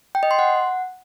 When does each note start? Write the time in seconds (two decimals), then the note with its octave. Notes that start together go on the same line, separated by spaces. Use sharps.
0.15 G5
0.23 D#5
0.31 C6
0.39 F#5